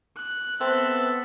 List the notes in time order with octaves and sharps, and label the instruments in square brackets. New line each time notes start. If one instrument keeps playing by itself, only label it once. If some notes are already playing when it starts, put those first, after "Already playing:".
[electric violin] F#6
[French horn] B3 [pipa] C4 [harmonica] A4 E5